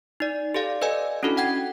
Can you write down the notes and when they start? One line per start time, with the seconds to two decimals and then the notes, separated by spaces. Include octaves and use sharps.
0.20 D#4 D5
0.54 G4 A4 D5 F5
0.81 A4 B4 D5 D#5 G#5
1.23 C#4 D4 E4 F#4 A4
1.37 F#5 G5 G#6